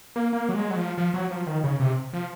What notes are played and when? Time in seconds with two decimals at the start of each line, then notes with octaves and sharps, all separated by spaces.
0.16 A#3
0.33 A#3
0.49 F#3
0.54 G#3
0.71 F#3
0.76 F3
0.98 F3
1.14 F#3
1.31 F3
1.47 D#3
1.64 C#3
1.80 C3
2.13 F3